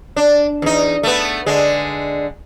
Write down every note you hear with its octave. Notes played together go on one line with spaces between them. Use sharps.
D4
E2 D#4
A3 B3
D3 G#3